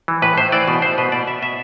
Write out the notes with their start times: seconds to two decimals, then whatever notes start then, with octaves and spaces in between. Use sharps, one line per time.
0.08 E3
0.22 A2 B4
0.38 A2 C5
0.52 E3 D5
0.68 B2
0.82 B2 C5
0.98 B2 B4
1.12 B2 D5
1.27 B2 E5
1.42 B2 E5